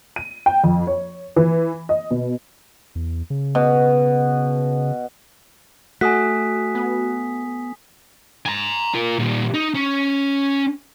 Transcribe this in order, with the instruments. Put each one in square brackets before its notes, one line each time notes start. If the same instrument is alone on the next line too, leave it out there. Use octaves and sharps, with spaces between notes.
[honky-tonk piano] D#7
G5
F2
C#5
E3
D#5
B2
[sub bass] E2
C#3
[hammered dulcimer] B2
[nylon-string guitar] A3 [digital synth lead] F#4 [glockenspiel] G#5 D#6 B6
[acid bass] B3
[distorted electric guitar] G#5 A#5
F4 A#4
A#2 G3
D#4
C#4